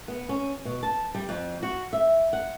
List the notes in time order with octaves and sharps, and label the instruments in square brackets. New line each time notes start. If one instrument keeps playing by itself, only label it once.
[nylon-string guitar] B3
C#4
B2
A5
G3
F2
F#4
E5
F#5